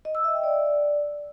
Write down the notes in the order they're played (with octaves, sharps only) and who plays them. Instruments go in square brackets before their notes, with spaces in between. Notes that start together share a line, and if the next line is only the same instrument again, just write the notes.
[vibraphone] D#5
E6
E5
G5
D5